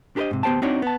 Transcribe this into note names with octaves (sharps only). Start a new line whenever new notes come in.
D4 G4 A4 B4 C5 D#5
G#2 C3
D2 B3 G4 C5 G5 A5
C4 D4 D#4 F#4 C#5 D5
B3 A5